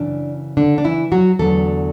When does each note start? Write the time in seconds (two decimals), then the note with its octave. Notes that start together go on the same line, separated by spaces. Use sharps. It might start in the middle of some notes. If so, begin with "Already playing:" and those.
Already playing: F#2 C#3 E3 D4
0.57 D3 D4
0.78 D4
0.84 E3 E4
1.12 F#3 F#4
1.39 E2 D3 F#3 A3 A4